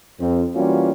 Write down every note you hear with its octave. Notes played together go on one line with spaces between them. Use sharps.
F2 C4
E3 G3 A#3 C#4 F4 F#4